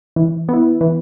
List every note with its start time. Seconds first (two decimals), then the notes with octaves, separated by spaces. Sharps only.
0.16 E3
0.49 B3 E4
0.81 E3